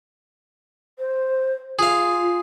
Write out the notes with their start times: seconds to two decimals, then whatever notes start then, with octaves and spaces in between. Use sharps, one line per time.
0.99 C5
1.79 F4 G#4 F5